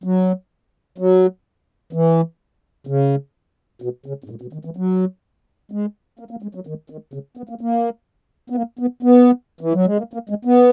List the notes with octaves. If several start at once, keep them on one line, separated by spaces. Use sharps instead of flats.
F#3
F#3
E3
C#3
B2
C#3
G#2
A#2
B2
D#3
E3
F#3
G#3
A#3
A#3
G#3
F#3
D#3
D#3
C#3
B3
A#3
A#3
B3
A#3
B3
B3
E3
F#3
G#3
A#3
A#3
G#3
B3